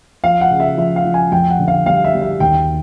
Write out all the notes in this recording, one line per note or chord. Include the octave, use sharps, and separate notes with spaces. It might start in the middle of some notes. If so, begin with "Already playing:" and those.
F3 F5
F#5
C#3
E5
F3 E5
F5
F3
G#5
F2 G5
F#5
D3
F5
G3 F5
E5
G3
E5
D#2 G5